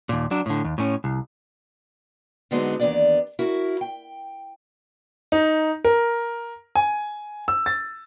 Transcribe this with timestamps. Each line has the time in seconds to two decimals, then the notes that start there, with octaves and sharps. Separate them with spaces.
0.09 D#2 A#2
0.31 F#3 D4
0.46 A2 D3
0.64 D#2
0.78 A2 C#4
1.04 C2
2.51 D3 F#3 G#3 B3 C4 D#4
2.80 D#2 E3 B3 D4 D5
3.39 E4 F#4 A#4
3.81 G5
5.32 D#4
5.85 A#4
6.75 G#5
7.48 E6
7.66 A6